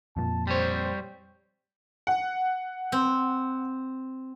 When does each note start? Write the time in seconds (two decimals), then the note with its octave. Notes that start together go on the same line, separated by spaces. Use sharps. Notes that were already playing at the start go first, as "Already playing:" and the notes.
0.17 F2 A#2 A5
0.47 G3 C4 C5 C#5
2.07 F#5
2.92 C4